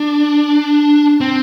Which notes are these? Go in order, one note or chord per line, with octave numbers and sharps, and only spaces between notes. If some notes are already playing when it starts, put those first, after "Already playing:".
Already playing: D4
C4